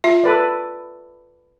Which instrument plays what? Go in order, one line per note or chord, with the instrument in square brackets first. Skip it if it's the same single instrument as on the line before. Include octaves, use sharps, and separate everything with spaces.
[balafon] F4 E5
[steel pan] A4 B4 D5